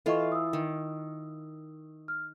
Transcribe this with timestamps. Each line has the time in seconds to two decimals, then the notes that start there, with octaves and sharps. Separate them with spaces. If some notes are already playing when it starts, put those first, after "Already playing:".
0.06 E3 F4 A4 D#5 C#6
0.32 D#6 E6
0.53 D#3
2.08 F6